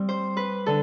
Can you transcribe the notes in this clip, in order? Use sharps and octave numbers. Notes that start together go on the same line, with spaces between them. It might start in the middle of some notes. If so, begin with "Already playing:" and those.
Already playing: G3 C4
C5
B4
D3 A4